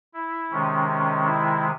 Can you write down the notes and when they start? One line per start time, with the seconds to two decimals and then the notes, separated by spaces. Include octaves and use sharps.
0.14 E4
0.51 C3 D#3 G#3 C#4
0.88 C#4
1.25 E4